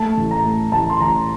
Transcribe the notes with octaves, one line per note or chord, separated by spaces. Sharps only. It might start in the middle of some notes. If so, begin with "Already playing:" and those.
Already playing: A3 A5
A1
A#5
A3
A1 A5
C6
A1 A#5